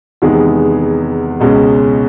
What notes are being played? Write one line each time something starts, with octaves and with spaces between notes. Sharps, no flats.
E2 C3 D#3 G#3 B3
C#2 B2 G#3 C#4